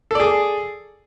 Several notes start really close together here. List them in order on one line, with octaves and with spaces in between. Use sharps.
A4 D5 G#4